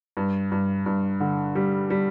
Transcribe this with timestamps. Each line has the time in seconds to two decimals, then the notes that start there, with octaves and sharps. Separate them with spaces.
0.17 G2
0.52 G2
0.86 G2
1.20 D3
1.55 G3
1.90 G3